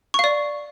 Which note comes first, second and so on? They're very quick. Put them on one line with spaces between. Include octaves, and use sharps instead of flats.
C#6 F5 D5